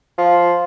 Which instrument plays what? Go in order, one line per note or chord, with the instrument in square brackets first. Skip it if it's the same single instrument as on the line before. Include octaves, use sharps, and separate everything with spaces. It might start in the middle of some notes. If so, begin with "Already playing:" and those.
[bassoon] F3